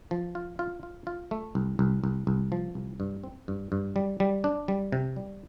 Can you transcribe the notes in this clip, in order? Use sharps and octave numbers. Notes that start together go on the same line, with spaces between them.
F3
F4
F4
F4
F4
A3
C2
C2
C2
C2
F3
C2
G2
C4
G2
G2
G3
G3
D4
G3
C3
G3